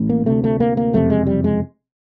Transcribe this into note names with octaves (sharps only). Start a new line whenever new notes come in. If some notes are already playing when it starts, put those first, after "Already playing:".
Already playing: A1 A2
A#3
D2 C3 A3
A3
A#3
A#3
F#1 F2 C3 A3
G#3
G3
G#3